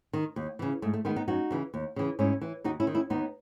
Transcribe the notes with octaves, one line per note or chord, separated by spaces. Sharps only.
D#3
D#2
C#3 E3
G#2 A3
A3
D#3 G#3 B3
B3 D#4
F#2 D#4 F#4
C#3 E3
D#2
C#3 E3
G#2 C#4 E4
E3
D#2 D#4 F#4
C#4 E4
D#3
C#4 E4
D#2 B3 D#4